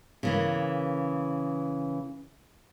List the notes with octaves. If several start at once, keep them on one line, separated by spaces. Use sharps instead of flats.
C#3 E3 A#3